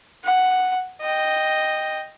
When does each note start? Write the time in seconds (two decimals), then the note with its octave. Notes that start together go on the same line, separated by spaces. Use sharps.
0.24 F#5
1.01 D#5 G5